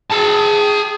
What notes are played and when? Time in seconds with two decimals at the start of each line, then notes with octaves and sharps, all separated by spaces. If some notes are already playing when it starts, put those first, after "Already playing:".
0.11 G#4 A5